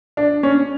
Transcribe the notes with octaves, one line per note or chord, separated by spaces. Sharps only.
D4
C#4